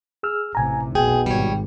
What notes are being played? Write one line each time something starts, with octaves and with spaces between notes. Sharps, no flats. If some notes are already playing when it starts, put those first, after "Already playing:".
G#4 E6 F6
A1 C3 G#5 A#5
F1 B1 B2 G#4 G5
G#1 G3 C#5